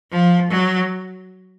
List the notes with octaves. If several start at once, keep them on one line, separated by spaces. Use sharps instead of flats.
F3
F#3